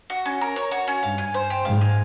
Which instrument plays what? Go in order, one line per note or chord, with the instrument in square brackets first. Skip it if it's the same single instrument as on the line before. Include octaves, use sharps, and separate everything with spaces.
[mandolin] F#4
C#4
A#4
C#5
F#4
C#4
[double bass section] G2 [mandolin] F5
[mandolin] G#5
C5
G4
[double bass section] G#2 [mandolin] F5
[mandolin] G#5